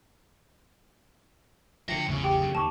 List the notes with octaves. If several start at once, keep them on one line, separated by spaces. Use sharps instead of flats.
D3 F3 E5 G5 A#6 C#7
A1 E2 C#3
G4 G5 D6
F#2 A#2 D3
D#2 D#3 A5 C#6 D6